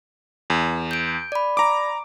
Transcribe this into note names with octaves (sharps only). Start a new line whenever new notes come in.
E2
G6 D7
D5 B5
A#5 D6